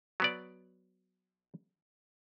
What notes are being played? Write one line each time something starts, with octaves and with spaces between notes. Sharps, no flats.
F#3 B3 D5